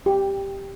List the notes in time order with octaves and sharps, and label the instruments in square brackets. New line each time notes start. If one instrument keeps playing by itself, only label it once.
[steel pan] G4